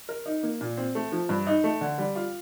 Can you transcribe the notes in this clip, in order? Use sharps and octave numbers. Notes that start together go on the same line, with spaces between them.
A#4
D#4
A#3
A#2
C4
A3
F3
G2
D#4
A3
D3
G3
F4